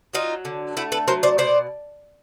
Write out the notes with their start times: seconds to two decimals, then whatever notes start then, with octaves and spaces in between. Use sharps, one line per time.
0.14 F#3 D#4 F4
0.45 D3
0.77 A3 E4 F#4
0.92 A4 B4
1.08 F#3 A#4 C5
1.23 C5 D5
1.38 B2 C5 D5